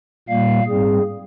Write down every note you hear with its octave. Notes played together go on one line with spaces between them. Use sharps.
A#2 G3 A#3 F5
G#2 G3 C4 G#4